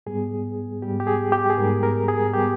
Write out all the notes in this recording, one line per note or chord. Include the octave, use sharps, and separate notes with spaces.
G#2 G3 B3 G#4
G#2 G3 B3 G4
G4
G#4
G4
G#4
G#2 G3 B3 A#4
A#4
G#4
G3 B3 G4